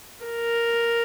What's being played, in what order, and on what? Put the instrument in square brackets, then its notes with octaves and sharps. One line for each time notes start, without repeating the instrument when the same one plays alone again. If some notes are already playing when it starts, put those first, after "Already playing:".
[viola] A#4